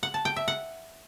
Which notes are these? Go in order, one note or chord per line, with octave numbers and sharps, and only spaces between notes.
F#5
A5
G5
E5
F#5